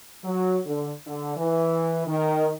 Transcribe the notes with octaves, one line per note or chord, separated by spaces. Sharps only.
F#3
D3
D3
E3
D#3